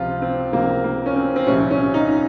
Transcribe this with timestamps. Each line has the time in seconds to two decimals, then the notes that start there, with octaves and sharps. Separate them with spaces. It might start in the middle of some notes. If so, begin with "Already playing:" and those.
Already playing: C#2 C3 F3 F4
0.22 C4
0.52 C#2 C3 F3 A#3
0.84 A#3
1.06 C#4
1.16 C4
1.36 C4
1.47 C2 A#2 F3 C#4
1.71 C#4
1.94 D#4